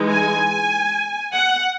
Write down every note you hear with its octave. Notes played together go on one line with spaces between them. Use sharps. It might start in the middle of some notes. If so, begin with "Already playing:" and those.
Already playing: E3 G#3 D#4
G#5
F#5